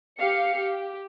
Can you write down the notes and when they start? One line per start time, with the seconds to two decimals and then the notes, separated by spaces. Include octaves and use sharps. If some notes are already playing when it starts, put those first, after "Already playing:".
0.19 G4 F5 C#7
0.59 G4